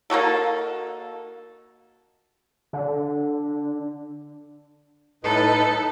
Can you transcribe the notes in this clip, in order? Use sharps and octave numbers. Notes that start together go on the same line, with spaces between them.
A#3 D#4 F#4 A4
D3
A2 D#4 A4 B4